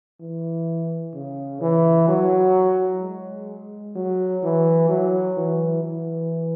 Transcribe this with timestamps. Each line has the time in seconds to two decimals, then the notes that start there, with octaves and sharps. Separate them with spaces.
0.20 E3
1.14 C#3
1.61 E3
2.08 F#3
3.02 G#3
3.95 F#3
4.43 E3
4.89 F#3
5.37 E3
5.83 E3